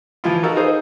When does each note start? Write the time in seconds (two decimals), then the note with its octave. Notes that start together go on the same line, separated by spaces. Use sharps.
0.24 E3 F3 E4 F4
0.43 D#4 F#4 A4 A#4 F5
0.56 D#4 G#4 C5